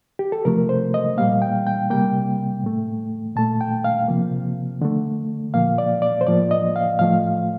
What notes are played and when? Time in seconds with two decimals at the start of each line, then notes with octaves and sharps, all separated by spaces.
0.19 G4
0.32 A4
0.45 C3 F3 A3 A#4
0.69 C5
0.94 D#5
1.17 A#2 G3 A#3 F5
1.42 G5
1.67 G5
1.90 C3 G3 A#3 G5
2.64 A2 A3
3.36 A#2 A3 A5
3.61 G5
3.84 F5
4.08 C3 F3 A#3
4.81 D3 A3
5.54 A#2 F3 A#3 F5
5.78 D5
6.02 D5
6.21 C5
6.27 A2 F3 A#3 D5
6.51 D#5
6.76 F5
6.99 A2 F3 A3 F5